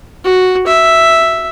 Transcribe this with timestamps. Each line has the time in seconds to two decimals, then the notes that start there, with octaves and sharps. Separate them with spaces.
0.24 F#4
0.67 E5